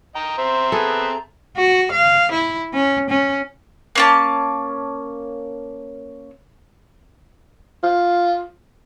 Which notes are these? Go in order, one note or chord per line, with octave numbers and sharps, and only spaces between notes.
D#5 G5 A#5
C4 C5 E5
B3 G#4 A4
F#4
F5
E4
C#4
C#4
A#3 C#4 A5
F4